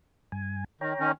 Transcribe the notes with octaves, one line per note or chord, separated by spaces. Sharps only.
G2 G#5
D#3 C#5 G5 A#5
D#3 C#4